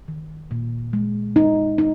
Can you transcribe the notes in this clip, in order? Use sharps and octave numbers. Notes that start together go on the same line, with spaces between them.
D#3
A#2
G#3
D#4
D#4